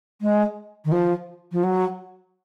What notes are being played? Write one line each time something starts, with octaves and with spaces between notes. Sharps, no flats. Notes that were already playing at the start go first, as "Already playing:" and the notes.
G#3
D#3
F3
F3
F#3